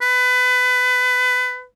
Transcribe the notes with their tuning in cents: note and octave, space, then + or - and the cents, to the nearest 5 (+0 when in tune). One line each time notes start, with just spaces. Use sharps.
B4 +25